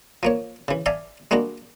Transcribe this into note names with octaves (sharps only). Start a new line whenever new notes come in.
F3 A#3 C#5
C#3 E3
D5 E5 F5 G#5 A5
G3 G#3 A#3 D4 F#4